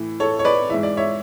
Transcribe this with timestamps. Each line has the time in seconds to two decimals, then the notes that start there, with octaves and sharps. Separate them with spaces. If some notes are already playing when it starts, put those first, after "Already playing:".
Already playing: A2 E3
0.20 A4 C#5
0.39 C#5
0.45 B4 D5
0.70 G#2 E3 E5
0.83 D5
0.97 C#5 E5